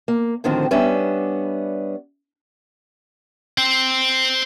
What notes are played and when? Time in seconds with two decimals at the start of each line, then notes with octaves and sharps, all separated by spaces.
0.08 A#3
0.44 A2 D3 D#3 F3 C4 F#4
0.71 G3 B3 C#4 D4 E5
3.58 C5 G5